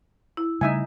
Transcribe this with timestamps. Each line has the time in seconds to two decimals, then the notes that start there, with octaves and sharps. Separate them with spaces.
0.37 E4
0.61 C#3 G3 A3 D#4 E5 G#5